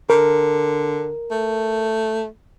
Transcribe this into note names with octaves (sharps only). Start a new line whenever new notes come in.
D3 A#4
A3